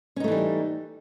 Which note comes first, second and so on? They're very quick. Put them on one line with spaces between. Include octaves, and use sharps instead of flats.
C#4 D#4 A3 E3 G3